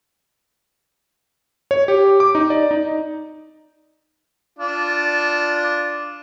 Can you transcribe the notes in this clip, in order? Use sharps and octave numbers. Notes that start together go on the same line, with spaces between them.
C#5
G4
D6
D#4
D5
D#4
D4 F4